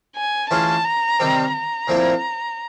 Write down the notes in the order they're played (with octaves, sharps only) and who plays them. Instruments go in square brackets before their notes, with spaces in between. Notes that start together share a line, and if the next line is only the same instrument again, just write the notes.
[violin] G#5
[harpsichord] E3 A3 C#4 F4 G#4 [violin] A5
[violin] A#5
[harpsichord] C3 D#3 G3 C4
[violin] A#5
[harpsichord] A#2 F3 A3 C4 E4